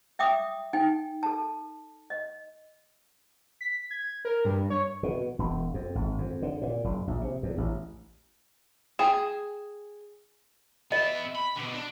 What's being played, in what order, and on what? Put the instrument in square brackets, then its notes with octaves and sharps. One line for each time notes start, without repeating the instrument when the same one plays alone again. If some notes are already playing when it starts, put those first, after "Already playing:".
[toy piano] E5 G5 D6 D#6
D#4 G5 G#5
A4 A5
D#5
[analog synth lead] B6
G#6
A#4
G2
C#5
[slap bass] B2
E1
F2
G#1
F2
D3
A#2
F#1
A#1
C3
E2
A1
[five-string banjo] G#4 [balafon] G5
[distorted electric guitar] B3 E5 [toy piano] D#5
[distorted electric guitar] B5
B2 D3
D4